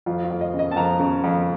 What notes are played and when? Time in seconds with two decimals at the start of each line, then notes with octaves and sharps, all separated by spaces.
0.06 F2 F4
0.24 F4
0.30 F2
0.41 D#5
0.54 C#3
0.59 D#5
0.71 A5
0.76 F2 A#5
0.99 C#3
1.24 F2